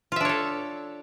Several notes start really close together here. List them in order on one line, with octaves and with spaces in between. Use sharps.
F4 E5 D4 C#5 A4